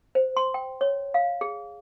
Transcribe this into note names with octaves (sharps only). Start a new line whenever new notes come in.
C5
C6
G5
C#5
F5
G#4